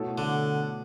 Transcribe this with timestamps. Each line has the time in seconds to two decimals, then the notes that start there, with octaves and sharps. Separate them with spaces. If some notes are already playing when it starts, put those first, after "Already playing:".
Already playing: B2 A3 E4 A4 C#5
0.18 D3